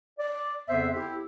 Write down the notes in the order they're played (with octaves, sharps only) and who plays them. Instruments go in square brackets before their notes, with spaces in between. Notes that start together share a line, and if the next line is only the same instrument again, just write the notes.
[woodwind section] D5
F2 C#3 B3 C5 E5
E4 G4